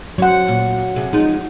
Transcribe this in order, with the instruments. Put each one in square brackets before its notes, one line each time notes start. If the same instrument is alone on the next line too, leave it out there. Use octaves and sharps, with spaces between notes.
[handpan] F#3 F#5 [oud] C5 C#5
[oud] A#2
C3 G#4
F3 G#3 D#4